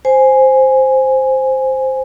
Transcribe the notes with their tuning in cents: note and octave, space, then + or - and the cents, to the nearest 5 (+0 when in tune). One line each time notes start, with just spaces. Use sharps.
C5 +0 G#5 +0